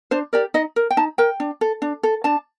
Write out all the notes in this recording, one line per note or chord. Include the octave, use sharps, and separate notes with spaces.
D4 C5
G4 A#4 D5
D#4 D#5
A#4
G5
D#4 A5
A#4 G5
D4
A4
D4
A4
D4 A5